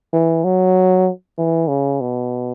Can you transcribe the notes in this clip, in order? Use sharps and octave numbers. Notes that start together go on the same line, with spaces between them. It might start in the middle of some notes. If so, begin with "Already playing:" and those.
E3
F#3
E3
C#3
B2